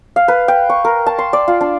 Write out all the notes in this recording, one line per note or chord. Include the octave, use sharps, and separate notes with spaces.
F5
B4
G5
C#6
A#4
A5
C6
D5
F4
D4